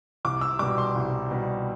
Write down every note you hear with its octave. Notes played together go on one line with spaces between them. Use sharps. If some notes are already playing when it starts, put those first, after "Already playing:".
C2 D6
E6
B2 G3 D6
C6
C2
B2 G3